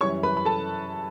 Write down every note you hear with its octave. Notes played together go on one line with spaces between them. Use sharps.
F#2 E3 G3 C#5 C#6
B4 B5
B5
A4 A5